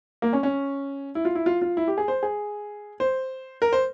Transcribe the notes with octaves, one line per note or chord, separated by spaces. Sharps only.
A#3
C#4
C#4
E4
F4
E4
F4
F4
E4
G4
G#4
C5
G#4
C5
A#4
C5